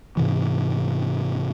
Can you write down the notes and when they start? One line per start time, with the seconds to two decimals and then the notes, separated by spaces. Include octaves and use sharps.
0.17 G#2 C3 E3